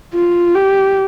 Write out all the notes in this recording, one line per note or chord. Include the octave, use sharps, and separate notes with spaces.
F4
G4